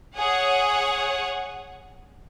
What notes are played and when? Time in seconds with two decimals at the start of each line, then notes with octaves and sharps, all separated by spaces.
0.16 G#4 C#5 F#5